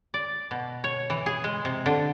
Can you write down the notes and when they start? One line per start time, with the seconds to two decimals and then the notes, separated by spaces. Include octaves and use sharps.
0.14 D5
0.51 B2
0.84 C#5
1.10 E3
1.26 G#4
1.44 G#3
1.65 C3
1.86 D3